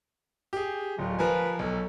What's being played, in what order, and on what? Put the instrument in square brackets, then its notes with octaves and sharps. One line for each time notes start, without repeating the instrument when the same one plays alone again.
[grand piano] G4 G#4
[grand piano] D1 [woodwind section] F#3 G#3 F4
[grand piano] F3 A#4 G#5 [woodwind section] B4
[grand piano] B1 [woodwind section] F#3 A4